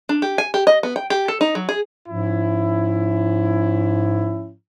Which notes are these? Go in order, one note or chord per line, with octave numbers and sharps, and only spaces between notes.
D4
G4
G#5
G4
D#5
B3
G5
G4
A4
D#4
F#3
G#4
G#2 F3 C#4 E4